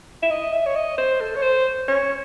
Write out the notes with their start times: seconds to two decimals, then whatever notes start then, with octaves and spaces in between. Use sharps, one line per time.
0.22 E5
0.30 D#5
0.53 E5
0.66 C#5
0.76 D#5
0.98 C5
1.21 A4
1.36 C#5
1.42 C5
1.88 C#5